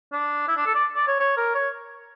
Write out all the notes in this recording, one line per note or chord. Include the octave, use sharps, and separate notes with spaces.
D4
E4
D4
A4
D5
D5
C#5
C#5
A#4
C#5